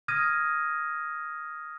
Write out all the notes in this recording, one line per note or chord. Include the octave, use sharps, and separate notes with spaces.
D#6 F6 G#6 A#6 D#7